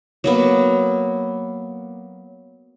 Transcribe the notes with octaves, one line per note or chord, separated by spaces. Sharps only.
F#3 A#3 B3